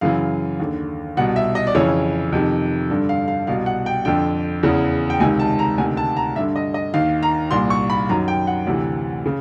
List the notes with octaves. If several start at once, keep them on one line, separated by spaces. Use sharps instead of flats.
F#2 C#3 E3 F5
D#2 D3
C2 B2 F#5
E5
D#5
D5
F2 C#3 E3 C#5
F2 C3 D#3
G2 D3
F5
F5
C2 B2 F5
F#5
G5
F2 D3 G5
E2 C#3 E3
G5
C#2 C3 D#3 G#5
A5
A#5
D2 C3 D#3 G#5
A5
A#5
G2 D3 E5
D#5
D#5
D#2 D#3 F5
A#5
C2 A#2 C6
C#6
B5
F#2 D#3 A#5
G5
F#5
D2 C3 E3
C#3